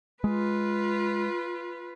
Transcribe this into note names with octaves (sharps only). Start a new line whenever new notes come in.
G#3 F4 B4